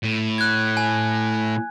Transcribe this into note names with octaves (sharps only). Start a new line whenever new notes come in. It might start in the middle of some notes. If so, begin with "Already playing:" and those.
A2
F#6 G#6
G#5